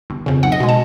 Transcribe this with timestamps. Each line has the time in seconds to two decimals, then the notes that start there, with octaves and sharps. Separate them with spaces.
0.10 G1
0.26 F2 C#3
0.43 B1 F#5
0.52 D#5
0.60 B2 G#3
0.69 A5